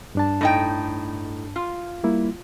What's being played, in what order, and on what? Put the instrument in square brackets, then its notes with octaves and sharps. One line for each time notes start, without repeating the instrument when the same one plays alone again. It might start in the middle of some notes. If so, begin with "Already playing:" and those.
[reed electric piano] G2 D4 A5
[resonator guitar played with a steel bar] A2 D#4 G5
F4
[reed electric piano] G3 A#3 E4